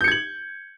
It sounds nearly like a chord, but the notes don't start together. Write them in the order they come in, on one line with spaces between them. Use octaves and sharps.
G6 C#7 G#6 F#7